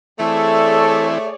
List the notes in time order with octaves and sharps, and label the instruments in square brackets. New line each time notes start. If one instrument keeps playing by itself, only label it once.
[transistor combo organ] E3 C4 E4 [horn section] A3 [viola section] G#4 C#5 D5 [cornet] A4